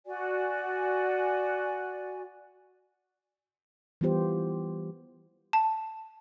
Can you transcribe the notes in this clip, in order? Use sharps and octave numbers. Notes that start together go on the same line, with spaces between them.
F#4 D5 G#5
E3 G3 B3 F4 G4 C5
A5